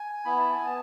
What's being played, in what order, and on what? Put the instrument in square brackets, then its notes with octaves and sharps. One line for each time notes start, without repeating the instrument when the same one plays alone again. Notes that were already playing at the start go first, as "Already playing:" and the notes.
Already playing: [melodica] G#5
B3 E4 B5
A5
G#5
B3 A5